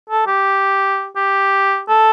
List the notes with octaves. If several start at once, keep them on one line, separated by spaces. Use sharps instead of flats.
A4
G4
G4
A4